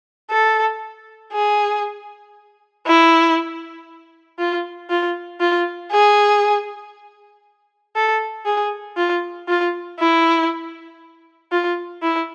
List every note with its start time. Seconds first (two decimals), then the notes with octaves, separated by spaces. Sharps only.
0.31 A4
1.33 G#4
2.87 E4
4.39 F4
4.90 F4
5.40 F4
5.92 G#4
7.96 A4
8.46 G#4
8.97 F4
9.48 F4
9.99 E4
11.52 F4
12.03 E4